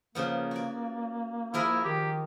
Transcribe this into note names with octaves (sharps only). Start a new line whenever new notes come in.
C#3 F3 A#3 B3
F#4 D5
F3 E4 G#4 A#4
D#3 G4